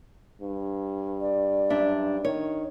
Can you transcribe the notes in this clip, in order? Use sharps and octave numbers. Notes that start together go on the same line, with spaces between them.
G2
D5
F#2 D4 E5
D#3 C#5